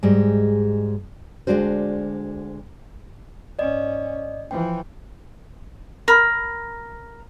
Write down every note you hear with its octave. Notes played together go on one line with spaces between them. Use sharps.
G#2 G3 G#3
D2 G#2 G#3 D4 F#4 C5
G#2 C#4 D5 D#5
E3 F3 G5
A#4 B5